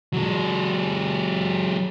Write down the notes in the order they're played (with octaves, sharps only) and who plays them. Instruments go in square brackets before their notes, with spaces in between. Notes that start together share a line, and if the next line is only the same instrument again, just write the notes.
[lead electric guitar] F#3 G#3